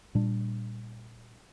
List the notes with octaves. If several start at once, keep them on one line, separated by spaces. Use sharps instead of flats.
A#2 G3 D4